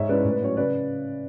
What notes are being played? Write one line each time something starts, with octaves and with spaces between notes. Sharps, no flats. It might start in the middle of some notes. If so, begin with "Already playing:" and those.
Already playing: G#2 C#5 E5
G#3 C#4 E4 B4 D5
A2
B4
F#3 C#4 C#5
C#3 B4 D5